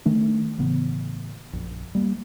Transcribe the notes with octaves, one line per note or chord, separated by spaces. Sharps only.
D#3 A3 D4
A1 C#3 E3 B3
A#1 F#2
G3 A#3